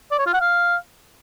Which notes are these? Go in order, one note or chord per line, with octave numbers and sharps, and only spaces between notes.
D5
C#5
F4
F#5
F5